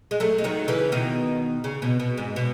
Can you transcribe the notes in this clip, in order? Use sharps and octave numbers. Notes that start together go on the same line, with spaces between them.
G#3
F#3 A3
G#3
D#3 F#3
C#3 E3
B2 D#3
C#3
B2
B2
G#2
B2